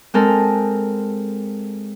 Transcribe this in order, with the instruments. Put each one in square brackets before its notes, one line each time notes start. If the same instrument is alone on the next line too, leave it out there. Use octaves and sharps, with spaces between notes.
[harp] G#3 C4 A4 A#4